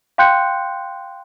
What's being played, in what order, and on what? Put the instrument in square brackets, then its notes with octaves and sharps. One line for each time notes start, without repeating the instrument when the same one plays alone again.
[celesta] F5 G5 C6 F#6 G6 C#7